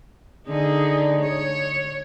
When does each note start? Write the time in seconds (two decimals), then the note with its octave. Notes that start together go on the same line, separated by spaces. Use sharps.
0.48 D3 D#4 G#4
1.20 C#5